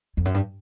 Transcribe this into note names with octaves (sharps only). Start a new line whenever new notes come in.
F2
F#2
G2